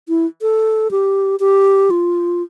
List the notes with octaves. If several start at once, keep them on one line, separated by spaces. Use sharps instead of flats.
E4
A4
G4
G4
F4